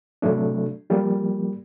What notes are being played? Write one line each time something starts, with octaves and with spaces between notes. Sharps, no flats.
C3 F#3 A3 D4
F3 G3 A#3